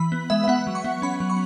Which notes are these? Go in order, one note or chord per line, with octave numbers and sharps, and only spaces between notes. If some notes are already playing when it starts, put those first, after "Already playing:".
Already playing: E3 B5
B3
G#3 E5
E5
B3 F#5
F#3
C#6
B3
C#4 B5
F#3
C#6